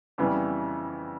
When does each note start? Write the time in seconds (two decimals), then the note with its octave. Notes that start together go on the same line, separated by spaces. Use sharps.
0.18 F2 C#3 E3 G3 B3